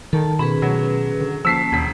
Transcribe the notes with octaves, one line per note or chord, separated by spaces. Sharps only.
D#3 A4 A5
B2 C#4 G#4 B4 B5
B2 F#3
D3
F3 A#3 C#4 A5 E6 B6 C7
E1 D#2 B6